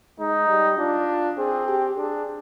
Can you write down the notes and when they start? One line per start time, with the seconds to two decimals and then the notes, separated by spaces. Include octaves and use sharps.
0.19 G#3 D#4
0.48 G3
0.78 D4 F4
1.38 C4 G#4
1.68 G4
1.97 D4 G#4